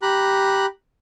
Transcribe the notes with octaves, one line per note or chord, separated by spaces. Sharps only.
G4 A#5 B5 F#6